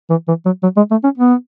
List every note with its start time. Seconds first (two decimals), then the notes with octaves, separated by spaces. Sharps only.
0.10 E3
0.28 E3
0.45 F#3
0.63 F#3
0.77 G#3
0.91 A3
1.04 C#4
1.18 B3